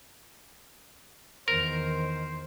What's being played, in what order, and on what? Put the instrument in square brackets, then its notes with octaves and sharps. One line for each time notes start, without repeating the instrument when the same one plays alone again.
[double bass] E2 D#3 [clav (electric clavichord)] A#4 [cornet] C5